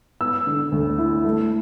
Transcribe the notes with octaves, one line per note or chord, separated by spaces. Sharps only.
B3 E6
D3
D2
E4
A3